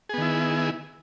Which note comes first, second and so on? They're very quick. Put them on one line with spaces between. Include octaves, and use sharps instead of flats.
G#4 B3 D#3 E4